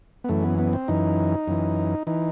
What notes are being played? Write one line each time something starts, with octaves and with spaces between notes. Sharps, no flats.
B3
F#2 E3 A3
B3
B3
C4
F#2 E3 D#4
F#2 E3
E3 D#4